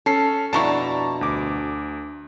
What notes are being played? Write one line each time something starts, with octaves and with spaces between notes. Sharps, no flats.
C#4 A4 C7
F2 B2 D4 E4 A5 A#5 C#6
D2 D6